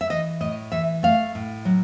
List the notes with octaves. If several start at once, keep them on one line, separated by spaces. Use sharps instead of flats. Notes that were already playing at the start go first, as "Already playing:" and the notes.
E5
E3 D#5
A2 D#5
E3 E5
A3 F5
A2
F#3